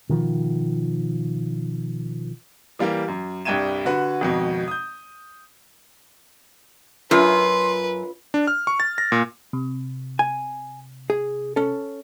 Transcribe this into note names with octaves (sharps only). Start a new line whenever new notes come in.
B2 D#3 F3
E3 G3 A#3 G4
F#2
C2 G2 G5 G#6 D#7 E7
D3 F#4 B4
G#1 F2 B2
D#6 G6
F#2 F4 B4 C6
D4
F6
C#6
A6
A#6
A#2
C3
G#5
G#4
C#4 A4